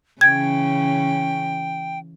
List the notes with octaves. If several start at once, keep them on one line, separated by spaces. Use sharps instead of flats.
C#3 E3 C#4 G5 G#6